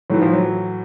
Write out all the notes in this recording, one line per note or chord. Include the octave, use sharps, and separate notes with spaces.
A2 E3 F#3
F3
F#3